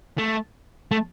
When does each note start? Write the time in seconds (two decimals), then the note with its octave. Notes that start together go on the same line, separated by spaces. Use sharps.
0.19 A3
0.91 A3